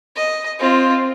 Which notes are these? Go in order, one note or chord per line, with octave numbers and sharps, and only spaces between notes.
D#5
C4 F4